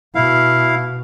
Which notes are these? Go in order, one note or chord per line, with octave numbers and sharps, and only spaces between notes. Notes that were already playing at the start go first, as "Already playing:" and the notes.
B2 E4 F5